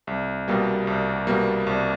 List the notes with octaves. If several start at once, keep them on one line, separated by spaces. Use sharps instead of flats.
C2
B2 G3 A#3
C2
B2 G3 A#3
C2